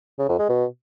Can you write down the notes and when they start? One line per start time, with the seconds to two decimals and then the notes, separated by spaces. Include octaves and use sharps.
0.19 C#3
0.29 F2
0.39 G#3
0.49 B2